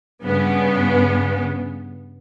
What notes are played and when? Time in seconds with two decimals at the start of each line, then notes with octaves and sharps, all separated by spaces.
0.23 G2 C#3 B3